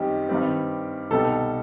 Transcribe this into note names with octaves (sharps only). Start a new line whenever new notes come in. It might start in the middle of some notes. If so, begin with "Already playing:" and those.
Already playing: F#2 D#3 G3 C4 D#4 G4
G2 D#3 G3 C4
C2 B2 G3 D#4 A4